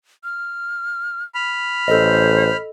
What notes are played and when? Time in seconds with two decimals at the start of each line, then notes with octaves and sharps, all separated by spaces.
0.24 F6
1.35 B5 F6
1.88 A1 A4 C5 D#5